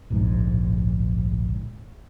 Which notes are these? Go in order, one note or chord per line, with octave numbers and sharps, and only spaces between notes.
D1 A#1 G#2